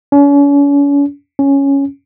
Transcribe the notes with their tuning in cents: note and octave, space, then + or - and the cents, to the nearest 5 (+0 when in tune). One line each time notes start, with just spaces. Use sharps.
C#4 +40
C#4 +0